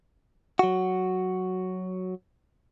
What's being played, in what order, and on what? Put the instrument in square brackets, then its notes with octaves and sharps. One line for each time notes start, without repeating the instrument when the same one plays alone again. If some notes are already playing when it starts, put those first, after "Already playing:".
[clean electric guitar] F#3 F#4